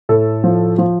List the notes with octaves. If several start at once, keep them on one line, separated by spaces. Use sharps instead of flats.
A2 A4
F3
F3